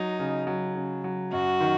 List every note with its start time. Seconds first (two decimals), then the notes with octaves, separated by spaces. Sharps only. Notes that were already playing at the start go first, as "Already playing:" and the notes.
Already playing: F#3 D#4
0.19 C#3
0.47 F#3
0.75 C#3
1.04 F#3
1.33 F#2 F#4
1.60 D#3